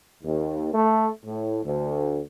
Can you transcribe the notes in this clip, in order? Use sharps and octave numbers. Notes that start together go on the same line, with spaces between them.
D#2
A3
A2
D2